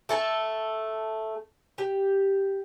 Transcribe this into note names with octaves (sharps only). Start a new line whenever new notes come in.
A3 A4 A5
G4